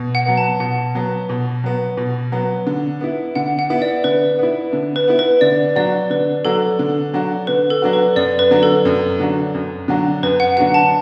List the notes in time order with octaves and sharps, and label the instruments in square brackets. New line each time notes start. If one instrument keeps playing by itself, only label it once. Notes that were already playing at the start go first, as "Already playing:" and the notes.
Already playing: [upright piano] B2
[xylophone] F#5
[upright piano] F#3 B3
[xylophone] A5
[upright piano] B2 [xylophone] F#5
[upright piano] F#3 B3
B2
F#3 B3
B2
F#3 B3
D3
B3 E4
[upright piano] D3 [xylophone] F#5
[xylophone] F#5
[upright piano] B3 E4
[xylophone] D5
[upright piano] D3 [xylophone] B4
[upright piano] B3 E4
D3
[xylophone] B4
[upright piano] B3 E4
[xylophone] B4
[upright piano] D3 [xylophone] D5
[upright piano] F#3 D4 F#4 [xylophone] D5
[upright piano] D3 [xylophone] B4
[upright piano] F#3 D4 F#4 [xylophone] A4
[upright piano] D3
F#3 D4 F#4
[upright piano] D3 [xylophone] B4
[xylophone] A4
[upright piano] F#3 D4 F#4
[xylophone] B4
[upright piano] F#2 [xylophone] D5
[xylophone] B4
[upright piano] D3 F#3 D4 F#4
[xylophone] A4
[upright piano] F#2
D3 F#3 D4 F#4
F#2
D3 F#3 D4 F#4
[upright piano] F#2 [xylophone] B4
[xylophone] F#5
[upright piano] D3 F#3 D4 F#4 [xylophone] F#5
[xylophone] A5